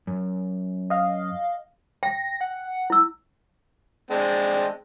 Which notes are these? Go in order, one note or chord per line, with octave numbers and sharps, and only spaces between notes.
F#2
D#5 F5
G5 A#6
F#5
E4 E6
G#3 C4 D4